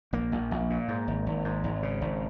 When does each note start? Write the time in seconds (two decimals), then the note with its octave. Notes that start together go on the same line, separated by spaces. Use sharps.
0.13 A#1 A#3
0.32 A#1
0.51 A#1
0.70 A#2
0.88 G#2
1.07 G#1
1.26 G#1
1.44 G#2
1.64 G#1
1.83 C#3
2.01 G#1